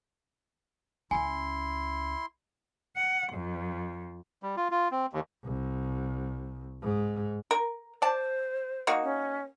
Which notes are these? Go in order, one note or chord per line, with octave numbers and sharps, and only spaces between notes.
C#2 C#4 E4 G#5 C6
F#5
F2
G3
F4
F4
C4
D#2
C2
G#2
A#4
C5 D5 A5
A#3 D#4 F#4
C#4